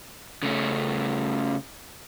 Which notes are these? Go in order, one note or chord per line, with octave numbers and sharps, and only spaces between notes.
C#3 A3 C#4